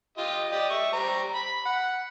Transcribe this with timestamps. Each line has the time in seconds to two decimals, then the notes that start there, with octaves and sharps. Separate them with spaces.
0.18 F4 G4 D#5
0.52 G4 D5 D#5
0.70 E5 C#6
0.93 G3 C5 A#5
1.35 B5
1.66 F#5